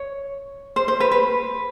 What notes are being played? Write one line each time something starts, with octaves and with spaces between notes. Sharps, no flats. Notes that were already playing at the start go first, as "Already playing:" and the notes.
Already playing: C#5
C5
C5
B4
B4